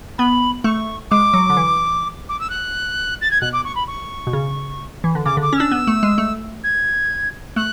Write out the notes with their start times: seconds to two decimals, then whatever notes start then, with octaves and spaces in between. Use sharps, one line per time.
0.18 B3 B5
0.64 A3 C#6
1.11 G#3 D6
1.34 F#3
1.50 D3
1.57 E3
2.29 D6
2.40 E6
2.50 F#6
3.22 A6
3.31 G#6
3.41 B2 F#6
3.53 D6
3.65 C#6
3.76 B5
3.87 C#6
4.27 B2
4.33 C#3
5.04 E3
5.15 D3
5.25 C#3 D6
5.37 D3 D6
5.53 C#4
5.57 D4 E6
5.71 B3
5.87 A3
6.03 G#3
6.18 A3
6.64 G#6
7.56 A3 F#6